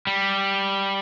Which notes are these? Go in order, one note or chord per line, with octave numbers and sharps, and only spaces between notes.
G3